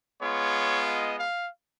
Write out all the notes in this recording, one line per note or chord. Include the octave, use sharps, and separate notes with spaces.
G#3 B3 F4 C#5
D#5
F5